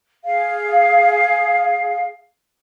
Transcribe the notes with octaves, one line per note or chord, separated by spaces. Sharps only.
G#4 F5